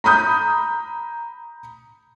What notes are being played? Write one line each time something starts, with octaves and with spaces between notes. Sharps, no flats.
A#5 B5 D#6 G6